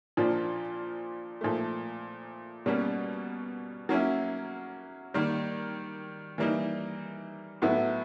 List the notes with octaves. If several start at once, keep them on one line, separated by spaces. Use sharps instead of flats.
A#2 F3 A#3 D4 F4
A#2 F3 A3
B2 G3 A#3 C#4
F#3 A#3 C#4 E4
D#3 G3 A#3
E3 G3 A#3 D#4
A2 F#3 B3 E4